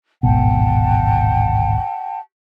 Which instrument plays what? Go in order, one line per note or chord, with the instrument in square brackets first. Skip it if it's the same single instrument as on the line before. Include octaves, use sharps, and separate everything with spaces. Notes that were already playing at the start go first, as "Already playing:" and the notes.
[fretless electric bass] D1 G#1 B2 [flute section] F#5 G5 A5